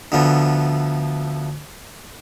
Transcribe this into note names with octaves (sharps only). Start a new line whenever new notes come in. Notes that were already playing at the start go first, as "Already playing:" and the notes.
D2 D3 F3 B3